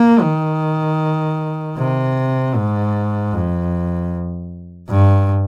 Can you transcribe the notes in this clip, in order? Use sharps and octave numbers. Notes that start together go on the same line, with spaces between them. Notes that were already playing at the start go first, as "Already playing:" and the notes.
Already playing: A#3
D#3
C3
G#2
F2
G2